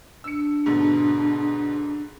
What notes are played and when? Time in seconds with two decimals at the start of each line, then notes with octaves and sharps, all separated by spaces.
0.24 D4 E6 C#7
0.66 G#2 B2 D3